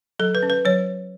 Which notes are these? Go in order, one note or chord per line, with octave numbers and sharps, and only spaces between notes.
F#3 A4
B4
C#4
B4
F#3 C#5